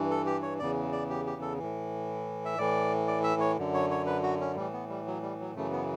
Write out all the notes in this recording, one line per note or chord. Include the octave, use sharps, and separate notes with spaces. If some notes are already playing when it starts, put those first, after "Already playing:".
Already playing: G2 E3
A4
G4
C#5
E2 C#3 E3 D5
D5
G4
G4
A4
A2 E3
E5
A2 E3 D5
D5
E5
C#5
F#2 D3
C#5
C#5
B4
F#4
C#4
A2 E3 G3
B3
G3
F#3
G3
F#3
F#2 C#3 E3 A3
B3